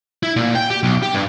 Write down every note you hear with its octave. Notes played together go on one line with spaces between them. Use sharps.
E4
A#2
G5
G4
B1
G4
G2